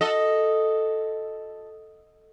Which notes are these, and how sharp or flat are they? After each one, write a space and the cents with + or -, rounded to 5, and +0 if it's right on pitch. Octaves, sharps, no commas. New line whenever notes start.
F#4 -30 A4 +0 D#5 +0